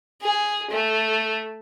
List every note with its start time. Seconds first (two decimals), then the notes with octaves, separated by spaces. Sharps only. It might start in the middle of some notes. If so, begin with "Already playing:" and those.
0.22 G#4
0.71 A3